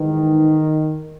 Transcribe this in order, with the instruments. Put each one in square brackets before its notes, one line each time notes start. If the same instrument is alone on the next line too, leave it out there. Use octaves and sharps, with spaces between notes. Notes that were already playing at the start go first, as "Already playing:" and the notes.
Already playing: [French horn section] G#2 E3 G#3 D#4 [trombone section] D#3